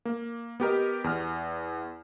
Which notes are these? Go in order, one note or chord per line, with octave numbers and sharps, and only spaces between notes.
A#3
B3 G4 A#4 D#5
E2 F6